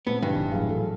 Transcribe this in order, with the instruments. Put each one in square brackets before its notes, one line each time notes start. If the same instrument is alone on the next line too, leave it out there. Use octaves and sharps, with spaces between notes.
[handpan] A#2 G#3 [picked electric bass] A3 C4 [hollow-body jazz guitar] B3
[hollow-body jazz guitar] G2 [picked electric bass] C#3 E3 [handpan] D#4
[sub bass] D#1
[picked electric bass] A2 E3 [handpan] F#3 G#4 F5
[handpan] A4